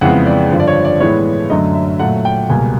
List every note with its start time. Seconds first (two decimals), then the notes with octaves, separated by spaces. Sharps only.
0.01 F2 C#3 E3 G#3 B3 F#5
0.26 D5
0.51 G2 D3 F3
0.60 D5
0.68 C#5
0.85 D5
1.00 A2 E3 G#3 B3 C#5
1.50 F#2 D3 F#3 A3 D#5
1.75 E5
1.99 A#2 F#3 A3 F#5
2.25 G5
2.49 C#2 B2 G3 A#3 G#5